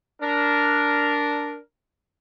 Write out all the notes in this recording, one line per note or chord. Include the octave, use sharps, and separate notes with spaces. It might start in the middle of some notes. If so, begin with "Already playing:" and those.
D4 A#4